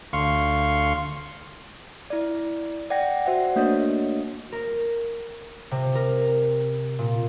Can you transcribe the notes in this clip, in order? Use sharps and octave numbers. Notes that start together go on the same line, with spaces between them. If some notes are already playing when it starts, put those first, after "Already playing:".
D2 F5 C6 C#6
E4 D5
D5 F#5 G5 A#6
F#4 C5 D5 E5 F#5
A3 A#3 D4 F#4 C#5 D#5
A#4
C3
A#4
A#2